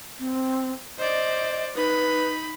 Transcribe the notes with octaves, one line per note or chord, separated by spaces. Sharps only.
C4
C5 D5 D#5
D#4 B4 B5